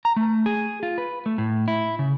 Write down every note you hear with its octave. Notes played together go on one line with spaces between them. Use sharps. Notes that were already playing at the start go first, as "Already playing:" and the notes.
A#5
A3
G#4
F4
B4
A3
A2
E4
C#3